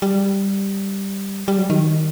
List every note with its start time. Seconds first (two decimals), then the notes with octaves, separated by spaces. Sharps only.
0.02 G3
1.48 G3
1.58 F#3
1.70 D#3